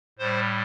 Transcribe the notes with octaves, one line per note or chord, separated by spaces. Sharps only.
A2 G3 C5